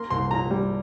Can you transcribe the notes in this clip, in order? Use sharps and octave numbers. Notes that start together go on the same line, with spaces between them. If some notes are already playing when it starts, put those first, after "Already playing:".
Already playing: A#3 C6
C2 C6
A#2 A#5
G3